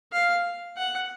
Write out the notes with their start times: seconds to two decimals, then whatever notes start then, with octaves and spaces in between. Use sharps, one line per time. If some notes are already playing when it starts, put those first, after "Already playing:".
0.12 F5
0.77 F#5